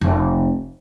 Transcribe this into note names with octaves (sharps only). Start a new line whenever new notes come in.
F1 C#2